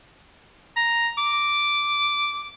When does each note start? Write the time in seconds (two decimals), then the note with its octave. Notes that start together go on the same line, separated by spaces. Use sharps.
0.77 A#5
1.18 D6